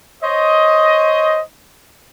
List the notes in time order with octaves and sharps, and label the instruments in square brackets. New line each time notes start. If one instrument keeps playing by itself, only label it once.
[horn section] C5 C#5 D#5